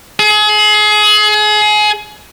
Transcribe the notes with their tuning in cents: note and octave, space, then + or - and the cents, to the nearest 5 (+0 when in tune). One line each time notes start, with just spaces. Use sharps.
G#4 +30